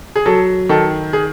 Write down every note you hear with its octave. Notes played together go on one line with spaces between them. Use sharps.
G#4
F#3 A4
D#3 A4
G#4